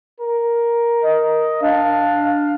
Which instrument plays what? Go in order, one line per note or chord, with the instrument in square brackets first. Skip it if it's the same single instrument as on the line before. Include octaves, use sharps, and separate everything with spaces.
[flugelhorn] A#4
[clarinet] D#5
[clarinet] D4 [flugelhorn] F5